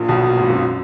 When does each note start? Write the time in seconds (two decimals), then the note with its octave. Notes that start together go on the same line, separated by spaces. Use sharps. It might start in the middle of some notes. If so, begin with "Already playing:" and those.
Already playing: A#1 A#2
0.09 B1 B2
0.27 A#2
0.37 G#1 G#2
0.49 F#2